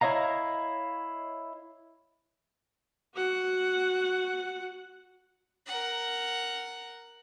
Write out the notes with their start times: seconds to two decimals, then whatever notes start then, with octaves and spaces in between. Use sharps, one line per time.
0.01 E4 C#5 D#5 F5 A#5
3.14 F#4 F#5
5.67 A#4 F#5